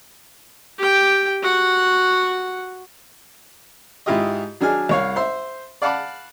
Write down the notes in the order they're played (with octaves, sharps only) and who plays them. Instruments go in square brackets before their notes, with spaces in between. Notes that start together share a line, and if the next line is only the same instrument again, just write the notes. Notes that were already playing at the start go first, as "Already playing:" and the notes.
[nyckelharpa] G4 G5
F#4 F#5
[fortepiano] G#2 E4 F4 G4 D#5
F#3 D4 G#4 G#5 F6
C2 C#5 F5
C5 E5 C6
D5 F5 F#5 A5 B5 D6